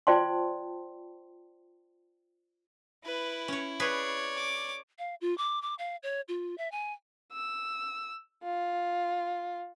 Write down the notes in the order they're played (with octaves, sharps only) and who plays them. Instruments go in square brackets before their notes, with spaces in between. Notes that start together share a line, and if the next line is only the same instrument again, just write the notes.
[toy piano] F4 C5 D5 G5 A5 C6
[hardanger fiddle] E4 [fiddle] B4
[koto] C#4 C#5
[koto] G#4 B4 [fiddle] C#5 D5
[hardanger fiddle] D6
[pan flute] F5
F4
D6
D6
F5
C#5
F4
E5
G#5
[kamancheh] E6
F4